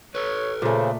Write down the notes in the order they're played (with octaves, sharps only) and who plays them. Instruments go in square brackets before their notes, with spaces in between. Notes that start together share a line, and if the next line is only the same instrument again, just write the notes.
[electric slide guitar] A4 B4 [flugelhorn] C#5
[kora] A#2 A3 [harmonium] C#3 [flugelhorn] C5